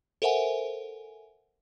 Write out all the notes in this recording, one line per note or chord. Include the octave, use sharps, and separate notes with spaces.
A4 A#4 C5 E5 F#5 G#5